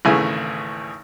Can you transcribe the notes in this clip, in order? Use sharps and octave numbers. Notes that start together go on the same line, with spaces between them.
G#1 D#2 C#3 E3 A3 G#5